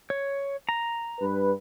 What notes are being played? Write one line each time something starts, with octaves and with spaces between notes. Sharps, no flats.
C#5
A#5
G2 B4